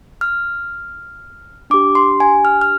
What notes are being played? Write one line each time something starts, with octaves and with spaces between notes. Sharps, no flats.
F6
D4 G4 D6
C6
G#5
F6
F6